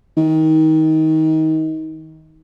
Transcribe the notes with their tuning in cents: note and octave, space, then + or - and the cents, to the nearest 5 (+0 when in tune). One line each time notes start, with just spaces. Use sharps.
D#3 +25